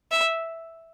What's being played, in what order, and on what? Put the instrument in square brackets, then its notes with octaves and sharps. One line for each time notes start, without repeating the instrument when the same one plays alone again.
[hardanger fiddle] E5